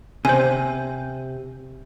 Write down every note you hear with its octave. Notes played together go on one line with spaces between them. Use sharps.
C3 C5 G#5